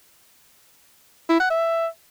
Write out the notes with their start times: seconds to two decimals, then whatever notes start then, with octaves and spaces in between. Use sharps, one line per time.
1.29 E4
1.40 F#5
1.50 E5